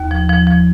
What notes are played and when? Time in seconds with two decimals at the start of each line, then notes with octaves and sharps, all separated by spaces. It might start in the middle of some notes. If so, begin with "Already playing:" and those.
Already playing: D#2
0.11 F3
0.29 F3
0.47 F3